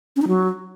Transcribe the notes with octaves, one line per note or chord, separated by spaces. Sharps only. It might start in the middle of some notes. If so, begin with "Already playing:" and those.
C#4
D#4
F#3